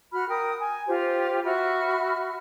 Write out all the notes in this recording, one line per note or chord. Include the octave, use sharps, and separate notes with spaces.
F#4 B5 F6
A#4 G5 D#6
G#5
F4 G4 C5
F#4 E5 B5 F6